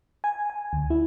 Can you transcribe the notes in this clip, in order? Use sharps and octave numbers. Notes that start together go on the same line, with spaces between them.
G#5
G#5
D2
E4